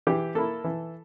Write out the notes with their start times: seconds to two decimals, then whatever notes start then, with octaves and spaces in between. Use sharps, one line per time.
0.07 E3 G4
0.35 A#3 E4 A4
0.64 E3